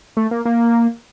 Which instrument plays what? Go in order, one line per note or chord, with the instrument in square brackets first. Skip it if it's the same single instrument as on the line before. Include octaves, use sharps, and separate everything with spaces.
[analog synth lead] A3
A#3
A#3